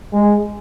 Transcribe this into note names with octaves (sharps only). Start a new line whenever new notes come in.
G#3